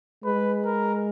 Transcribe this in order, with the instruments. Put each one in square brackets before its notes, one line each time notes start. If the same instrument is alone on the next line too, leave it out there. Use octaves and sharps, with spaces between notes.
[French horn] G#3 [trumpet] B4
[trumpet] A#4